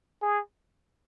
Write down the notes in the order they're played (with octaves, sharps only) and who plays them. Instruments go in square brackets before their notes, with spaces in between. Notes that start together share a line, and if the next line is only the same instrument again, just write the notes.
[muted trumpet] G#4